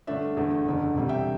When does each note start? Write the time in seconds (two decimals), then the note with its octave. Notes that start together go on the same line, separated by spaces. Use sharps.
0.07 G2 D3 A3 D4 E5
0.37 E2 D3 A3
0.65 F#1 E2 D3
0.95 E1 D2 C3 G3
1.09 E5 G5